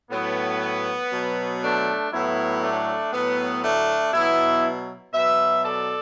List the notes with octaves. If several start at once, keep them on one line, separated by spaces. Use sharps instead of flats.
A2 F#3 B3
B2 F#3
A3 D4
A2 F#3 B3 E4
A3 D4
A2 F#3 B3
A3 D4
B2 F#3 B3 E4
B2 F#3 B4 E5
A4 D5